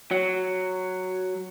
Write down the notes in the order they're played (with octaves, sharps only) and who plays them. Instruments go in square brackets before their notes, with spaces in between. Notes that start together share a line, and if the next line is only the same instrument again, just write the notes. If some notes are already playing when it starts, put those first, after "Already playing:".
[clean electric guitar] F#3